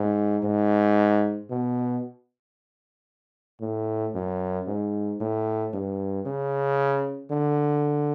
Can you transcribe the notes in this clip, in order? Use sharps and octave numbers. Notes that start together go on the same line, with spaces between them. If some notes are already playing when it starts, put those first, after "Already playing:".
Already playing: G#2
G#2
B2
A2
F#2
G#2
A2
G2
C#3
D3